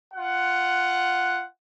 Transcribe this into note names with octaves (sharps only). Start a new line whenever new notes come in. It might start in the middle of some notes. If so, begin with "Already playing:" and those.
F4 F#5